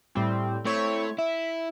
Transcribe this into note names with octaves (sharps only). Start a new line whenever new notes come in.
A2 G3 C4
A3 C4 E4 C#5
E4 E5